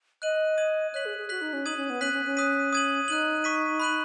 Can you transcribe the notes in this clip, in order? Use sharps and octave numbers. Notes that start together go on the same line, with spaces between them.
D#5 F#6 D#7 F#7
D#6 G#6 D#7 F#7
C#5 F#6 B6 F#7
G#4
G#4
F#4 F#6 B6 F#7
D#4
C#4
D#4 D#6 G#6 D#7 F#7
C#4
B3
C#4 F#6 B6 D#7 F#7
C#4
C#4
D#6 F#6 B6 D#7
D#6 G#6 D#7 F#7
D#4 F#6 D#7 F#7
C#6 B6 D#7
B5 F#6 D#7 F#7